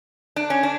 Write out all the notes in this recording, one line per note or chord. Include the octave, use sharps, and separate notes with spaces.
D4
C#4
D4